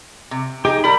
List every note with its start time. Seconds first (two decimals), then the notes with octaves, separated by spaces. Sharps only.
0.31 C3
0.65 D#4 G4 G#4
0.84 G3 A#4 B5